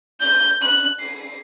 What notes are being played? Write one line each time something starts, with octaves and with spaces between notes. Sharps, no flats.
G6
F#6
C7